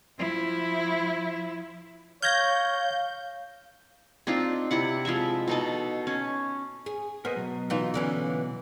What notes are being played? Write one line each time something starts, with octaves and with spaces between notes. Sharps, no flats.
F3 E4
C#5 F5 F6 G6 G#6 A#6
C4 D4 D#4 F4
C3 E4 F#5
F3 G#3 C4 E5
B2 D#4 A4
C#4
G#4
B3 A#4 C5 D#5
B2 F#3
E3 D#4 F4
D3 E3 C#4